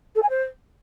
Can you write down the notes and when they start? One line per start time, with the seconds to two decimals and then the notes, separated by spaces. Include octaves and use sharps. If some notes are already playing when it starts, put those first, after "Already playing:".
0.15 A4
0.22 G#5
0.29 C5